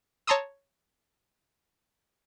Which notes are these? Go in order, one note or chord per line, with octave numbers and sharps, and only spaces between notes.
C#5 A5 A#5 C6 D#6 E6